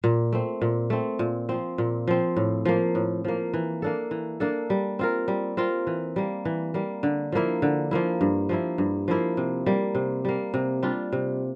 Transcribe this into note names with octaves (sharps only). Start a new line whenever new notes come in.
A#2
A3 C4
A#2
A3 C4
A#2
F3 C4
A#2
F3 C4
A2
F3 A#3
A2
F3 A#3
E3
A#3 D4 A4
E3
A#3 D4 A4
G3
C4 F4 A#4
G3
C4 F4 A#4
E3
G3 A#3
E3
G3 A#3
D3
F3 A#3 E4
D3
F3 A#3 E4
G2
F3 A#3 E4
G2
F3 A#3 E4
C3
G3 A#3
C3
G3 A#3
C3
G3 D4 F4
C3